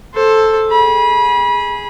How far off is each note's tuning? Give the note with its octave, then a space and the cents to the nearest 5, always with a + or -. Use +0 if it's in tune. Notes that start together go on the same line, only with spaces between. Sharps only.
A4 +0 C5 +15
G#4 -5 B5 -30